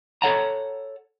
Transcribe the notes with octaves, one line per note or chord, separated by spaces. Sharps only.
A4 A#4 C#5 F#5 A5 A#5